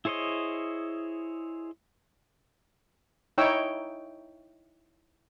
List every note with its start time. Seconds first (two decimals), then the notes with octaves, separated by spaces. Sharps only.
0.05 E4 G#4 C5 C#5 D#5
3.38 D#4 E4 C#5 G5 E6